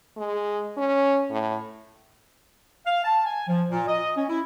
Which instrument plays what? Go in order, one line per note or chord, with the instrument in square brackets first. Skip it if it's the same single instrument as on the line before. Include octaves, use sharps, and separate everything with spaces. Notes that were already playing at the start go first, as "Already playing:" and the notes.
[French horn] G#3
C#4
A2
[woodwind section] F5
A5
G#5
F3
A#2
D#5
C#4
E4